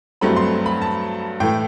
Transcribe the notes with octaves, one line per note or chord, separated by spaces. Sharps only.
G2 F#3 A3 C4 B5
C6
B5
A5
A2 E3 A3 G5